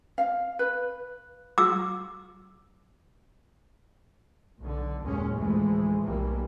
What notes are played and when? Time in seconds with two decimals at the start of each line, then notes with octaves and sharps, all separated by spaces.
0.18 F5
0.59 B4
1.58 D6 E6
4.60 B1 D3
5.03 F#1 D#2 A#2 G#3 C#4
5.37 D2 A2 E3 F3 G#3 A3
6.04 F1 B1 E3 G3 A#3